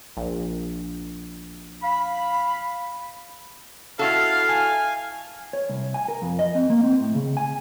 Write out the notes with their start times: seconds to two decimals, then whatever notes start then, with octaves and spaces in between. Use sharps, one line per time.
0.17 A#1
1.83 F5 B5
3.99 E4 F#4 A4 F5 A5 F6
4.49 G#5
5.53 C#5
5.69 C2
5.94 G#5
6.08 A#4
6.22 F2
6.39 D#5
6.55 C4
6.70 A#3
6.84 C4
7.00 A2
7.15 C#3
7.37 G#5